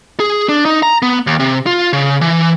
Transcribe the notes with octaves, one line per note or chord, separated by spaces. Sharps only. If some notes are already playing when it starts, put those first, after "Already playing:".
G#4
D4
D#4
A#5
B3
D#2
C3
F4
C#3
E3